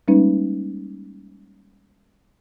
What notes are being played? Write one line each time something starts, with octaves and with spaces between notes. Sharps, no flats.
G3 G#3 A#3 C#4 D#4 B4